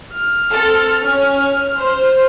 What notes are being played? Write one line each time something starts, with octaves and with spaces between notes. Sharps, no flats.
F6
C4 A4
C#4
C5